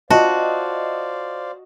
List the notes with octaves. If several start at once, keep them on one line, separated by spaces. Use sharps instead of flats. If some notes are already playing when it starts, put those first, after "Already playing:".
F4 F#4 C5 D5 D#5 F5 A5